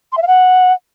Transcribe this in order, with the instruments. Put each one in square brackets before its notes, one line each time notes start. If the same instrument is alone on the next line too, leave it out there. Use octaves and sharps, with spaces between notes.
[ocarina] C6
E5
F5
F#5